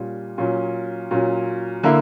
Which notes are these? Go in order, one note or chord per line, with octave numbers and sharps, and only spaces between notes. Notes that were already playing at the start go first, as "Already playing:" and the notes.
Already playing: A#2 G3 C#4
A#2 F#3 C#4
A#2 F#3 C#4
D3 A#3 E4 A#4 E5